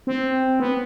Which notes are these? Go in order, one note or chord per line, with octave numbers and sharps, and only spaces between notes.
C4
B3